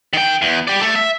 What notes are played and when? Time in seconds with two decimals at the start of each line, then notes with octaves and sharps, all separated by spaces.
0.13 D#3 G5
0.42 E2
0.68 G4 D5
0.81 A3 A4
0.96 E5